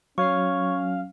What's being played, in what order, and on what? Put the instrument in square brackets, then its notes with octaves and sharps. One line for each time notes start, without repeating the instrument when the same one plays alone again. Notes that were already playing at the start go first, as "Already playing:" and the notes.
[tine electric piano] F#3 [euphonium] C#4 [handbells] C#5 C#6 [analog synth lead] F5